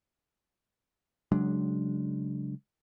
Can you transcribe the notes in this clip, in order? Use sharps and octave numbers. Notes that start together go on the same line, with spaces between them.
C#3 F#3 G#3 D4